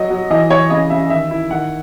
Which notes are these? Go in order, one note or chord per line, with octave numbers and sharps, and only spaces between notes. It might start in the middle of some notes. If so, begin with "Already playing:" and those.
Already playing: F#3 D#5
F#3
E3 D#5
E3 C#5
C#3 D#5
C#3 E5
D#3 E5
E4
D#3 F#5